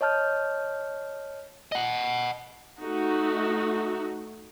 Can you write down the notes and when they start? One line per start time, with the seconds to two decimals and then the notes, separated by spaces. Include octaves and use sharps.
0.01 C#5 D#5 A5 F6 G6
1.72 D#5 F#5
2.79 A3 D#4 F#4